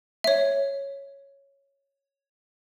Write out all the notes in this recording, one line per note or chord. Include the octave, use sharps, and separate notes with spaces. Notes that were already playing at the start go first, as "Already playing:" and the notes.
C#5 E5